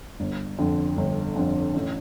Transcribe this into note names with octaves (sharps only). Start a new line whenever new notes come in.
G1
F2 D3
G1
F2 D3
A1